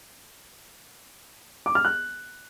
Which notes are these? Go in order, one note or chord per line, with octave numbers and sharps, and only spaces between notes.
D6
F6
F#6